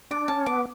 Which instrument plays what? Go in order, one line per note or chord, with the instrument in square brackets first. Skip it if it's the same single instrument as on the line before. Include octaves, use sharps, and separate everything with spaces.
[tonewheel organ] D4 [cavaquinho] D6
[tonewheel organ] C#4 [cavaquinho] A5
[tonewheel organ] B3 [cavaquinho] D6